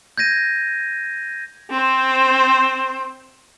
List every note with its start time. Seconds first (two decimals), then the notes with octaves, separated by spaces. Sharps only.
0.18 G6 G#6 A#6 D#7
1.70 C4 C5